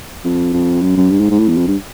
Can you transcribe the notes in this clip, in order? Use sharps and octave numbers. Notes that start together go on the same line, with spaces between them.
F2
F2
F#2
F#2
G2
G#2
G#2
A2
E2
F2
G2